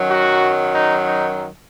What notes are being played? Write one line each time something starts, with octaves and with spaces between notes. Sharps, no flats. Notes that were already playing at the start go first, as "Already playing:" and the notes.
Already playing: F#2 D#3 F#3
F#4
D#4
D#4